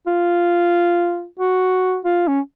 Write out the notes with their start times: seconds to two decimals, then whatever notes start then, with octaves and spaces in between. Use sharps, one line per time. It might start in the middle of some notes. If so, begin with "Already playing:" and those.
0.07 F4
1.39 F#4
2.05 F4
2.27 C#4